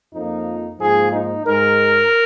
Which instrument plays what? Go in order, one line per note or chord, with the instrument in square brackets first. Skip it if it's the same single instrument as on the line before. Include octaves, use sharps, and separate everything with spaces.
[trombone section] F2 F3 A#3 D#4
G#2 F3 A#3 G#4
D#4
G#2 G#3 A#4